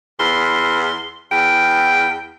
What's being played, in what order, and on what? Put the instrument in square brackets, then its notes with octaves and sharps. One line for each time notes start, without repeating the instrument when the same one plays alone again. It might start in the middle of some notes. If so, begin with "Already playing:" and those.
[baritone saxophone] E2 [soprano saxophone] C6
[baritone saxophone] E2 [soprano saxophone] G5